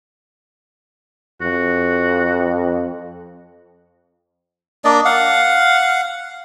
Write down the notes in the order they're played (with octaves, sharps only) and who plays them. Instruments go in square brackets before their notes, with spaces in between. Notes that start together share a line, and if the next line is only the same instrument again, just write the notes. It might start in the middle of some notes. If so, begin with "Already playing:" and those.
[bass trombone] F2 [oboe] F#4
[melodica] A#3 D4 D5 D#5
F5 F#5